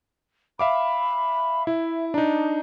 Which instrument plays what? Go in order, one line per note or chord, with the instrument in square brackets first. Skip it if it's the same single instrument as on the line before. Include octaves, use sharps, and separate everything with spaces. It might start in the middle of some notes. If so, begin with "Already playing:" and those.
[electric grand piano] E5 F5 D6 [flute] B5
[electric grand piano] E4 [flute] E5
[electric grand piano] D4 D#4 [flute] A#5